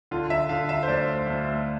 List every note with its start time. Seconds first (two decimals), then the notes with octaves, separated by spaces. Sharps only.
0.11 D3 F4
0.30 E5
0.49 D3 F5
0.69 E5
0.83 C5
0.88 D2 D5
1.27 D2